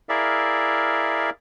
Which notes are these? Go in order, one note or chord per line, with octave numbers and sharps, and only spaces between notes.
E4 G#4 A#4 D5 E5 F5